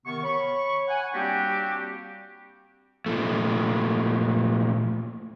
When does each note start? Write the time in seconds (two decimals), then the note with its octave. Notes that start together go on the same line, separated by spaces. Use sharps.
0.06 C3 D#3 B3 C#6
0.23 C#5 B5 C#6
0.88 F#5 G#5
1.13 G3 A#3 C4 D4 F#4 G4
3.06 A#2 F3 A3